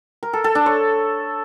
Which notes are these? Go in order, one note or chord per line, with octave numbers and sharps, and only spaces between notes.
A#4
A4
A4
D4
C#5